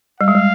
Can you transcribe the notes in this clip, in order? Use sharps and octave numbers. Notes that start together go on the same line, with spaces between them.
G3 F5
G#3
G3